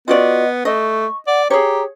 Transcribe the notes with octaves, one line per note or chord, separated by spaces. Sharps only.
B3 F4 F#4 D5 D#5
A3 D#5 C#6
D5 F#5
G4 G#4 C#5 A#5